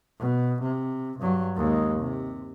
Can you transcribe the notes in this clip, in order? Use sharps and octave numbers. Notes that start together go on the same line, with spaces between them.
B2
C3
G2 F#3
D#2 G#3
C3